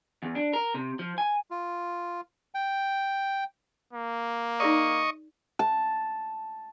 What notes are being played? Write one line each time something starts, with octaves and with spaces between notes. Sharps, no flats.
E2
D4
A#4
C3
F3
G#5
F4
G5
A#3
D#4 G#4 D5 D#5 C#6
A5